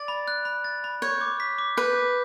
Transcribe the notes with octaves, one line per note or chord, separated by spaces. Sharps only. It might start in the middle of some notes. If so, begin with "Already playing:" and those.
Already playing: D5 A6
B5
F#6
B5
A6
B5
C#5 G6
D6
B6
D6
B4 G6
D6